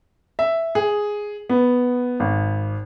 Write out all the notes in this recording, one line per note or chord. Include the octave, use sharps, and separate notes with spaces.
E5
G#4
B3
G#1